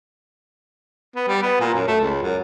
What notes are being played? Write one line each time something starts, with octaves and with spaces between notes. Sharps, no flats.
B3
G3
B3
A#2
F#2
A3
C#2
F#2